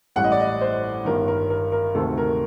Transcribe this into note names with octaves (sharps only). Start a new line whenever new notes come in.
A1 A2 G3 F#5
D#5
D5
D#5
C5
G1 G2 D#3 A#4
A#4
A#4
A#4
D2 C3 D#3 A4
A#4